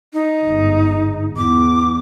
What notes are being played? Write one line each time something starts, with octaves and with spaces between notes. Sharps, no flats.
D#4
G1 G#2
E2 D6